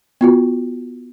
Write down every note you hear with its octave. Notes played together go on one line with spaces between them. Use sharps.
B3 F4 F#4